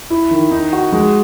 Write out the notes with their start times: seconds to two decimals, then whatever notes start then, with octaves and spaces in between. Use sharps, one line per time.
0.10 E4
0.31 D#3
0.51 D#4
0.73 F#4
0.92 G#3